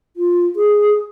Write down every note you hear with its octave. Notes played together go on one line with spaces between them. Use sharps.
F4
G#4